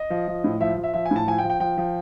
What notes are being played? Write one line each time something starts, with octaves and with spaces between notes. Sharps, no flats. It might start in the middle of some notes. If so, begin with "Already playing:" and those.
Already playing: D#5
F3
F3
A2
F3 E5
F3
E5
F3 E5
G#5
A2 A5
F3 G#5
G5
F3
G5
F3 G5
F3